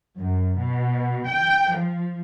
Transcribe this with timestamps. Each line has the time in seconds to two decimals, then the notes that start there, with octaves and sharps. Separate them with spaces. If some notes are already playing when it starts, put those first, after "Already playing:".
0.17 F#2
0.58 B2
1.27 G5
1.74 F3